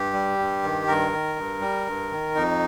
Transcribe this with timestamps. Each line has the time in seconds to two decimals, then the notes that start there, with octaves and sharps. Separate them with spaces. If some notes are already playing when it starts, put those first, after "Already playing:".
Already playing: G2 G4
0.13 G3
0.39 G2
0.63 D#3
0.87 G2 A#4
1.12 D#3
1.36 G2
1.61 G3
1.86 G2
2.11 D#3
2.35 F2 D#4